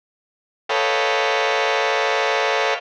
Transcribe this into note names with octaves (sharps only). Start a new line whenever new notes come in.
A4 B4 C#5 D#5 F5 G5